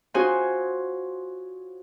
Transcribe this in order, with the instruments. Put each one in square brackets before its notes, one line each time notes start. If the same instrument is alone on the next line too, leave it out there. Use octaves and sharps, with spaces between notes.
[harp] C#4 F4 F#4 G#4 C5 G#5